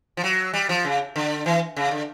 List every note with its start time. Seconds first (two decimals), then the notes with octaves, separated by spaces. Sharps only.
0.17 F3
0.24 F#3
0.54 G3
0.69 F3
0.85 C#3
1.16 D3
1.46 E3
1.76 C#3
1.91 D3